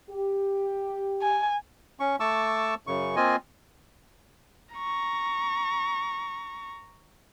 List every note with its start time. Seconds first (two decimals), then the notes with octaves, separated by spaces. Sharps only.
0.10 G4
1.22 G#5
2.00 C#4 C#6
2.20 A3 A5 C#6 D6 E6
2.87 F#2 C#3 C#6
3.16 A#3 C4 F4 D#5 G#5
4.75 A#5 C#6